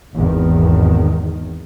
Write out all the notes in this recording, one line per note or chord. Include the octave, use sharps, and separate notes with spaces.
G#1 E2 D#3